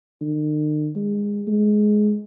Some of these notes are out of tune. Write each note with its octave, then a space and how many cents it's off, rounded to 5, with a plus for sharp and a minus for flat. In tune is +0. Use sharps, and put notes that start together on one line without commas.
D#3 -45
G#3 -20
G#3 +15